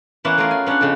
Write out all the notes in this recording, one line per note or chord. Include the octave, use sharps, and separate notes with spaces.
E3 A#3 B3 C#4 E5 F#5
A3 B3 F4 G#4 A#4
G#5
B3 C#4 D4 C#5 F#5
F2 C#3